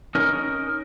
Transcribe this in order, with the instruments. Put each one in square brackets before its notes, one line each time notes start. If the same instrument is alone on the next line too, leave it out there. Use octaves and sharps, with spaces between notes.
[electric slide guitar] C#4 D#4 A#4